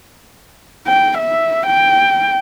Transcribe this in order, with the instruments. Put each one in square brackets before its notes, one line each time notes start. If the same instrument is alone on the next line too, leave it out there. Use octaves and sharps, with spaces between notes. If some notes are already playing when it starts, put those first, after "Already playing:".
[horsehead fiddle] G5
E5
G5